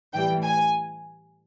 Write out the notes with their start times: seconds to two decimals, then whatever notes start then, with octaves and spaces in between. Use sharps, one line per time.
0.14 A2 E3 G3 G5
0.44 G#5